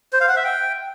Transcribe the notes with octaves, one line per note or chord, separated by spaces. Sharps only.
C5
F5
F#5
E5
G5